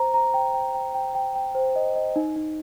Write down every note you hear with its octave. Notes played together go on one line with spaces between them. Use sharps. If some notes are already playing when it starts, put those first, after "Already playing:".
Already playing: C5 A#5
A#5
G5
G5
G5
G5
G5
G5
C5
D#5
D#5
D#4
D#4